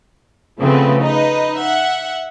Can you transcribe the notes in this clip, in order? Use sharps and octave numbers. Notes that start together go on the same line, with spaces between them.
C#3 F3 A3 B3 C4 B4
D#4 B4 D#5
E5 F#5